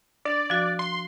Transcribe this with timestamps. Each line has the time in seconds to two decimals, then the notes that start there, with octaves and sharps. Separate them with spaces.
0.25 D4 D5
0.50 F3 F#4
0.79 C6